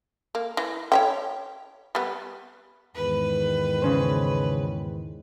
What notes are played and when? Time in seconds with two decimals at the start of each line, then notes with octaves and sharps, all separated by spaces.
0.35 A#3
0.57 E3
0.92 C#5 E5 G5
1.95 G3 B3
2.95 E2 G#2 D#3 B4
3.82 C#3 C#4 C5